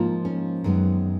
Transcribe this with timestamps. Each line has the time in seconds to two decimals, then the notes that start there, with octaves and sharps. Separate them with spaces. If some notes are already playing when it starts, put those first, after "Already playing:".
Already playing: G#2 F3 A#3
0.25 C#4
0.64 F#2 D#3 G#3 B3